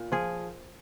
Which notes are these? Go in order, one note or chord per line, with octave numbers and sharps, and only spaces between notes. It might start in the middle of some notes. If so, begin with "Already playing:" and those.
Already playing: A#2
F3 G#4